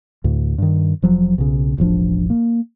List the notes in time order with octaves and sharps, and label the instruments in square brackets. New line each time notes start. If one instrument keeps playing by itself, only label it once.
[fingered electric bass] D2 A2
G2 D#3
F1 F3 F#3
B1 C#3
E1 A1 F3 D4
A#3